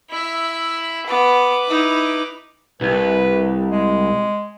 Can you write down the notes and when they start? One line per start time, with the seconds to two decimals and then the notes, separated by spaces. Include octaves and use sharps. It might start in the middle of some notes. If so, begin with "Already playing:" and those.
0.10 E4 E5
1.07 B3 B4 D6
1.67 D#4 E4
2.81 C2 B4
3.71 G#3